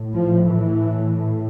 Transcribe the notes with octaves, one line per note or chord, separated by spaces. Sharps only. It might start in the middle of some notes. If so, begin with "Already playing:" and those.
Already playing: A2
F3
E3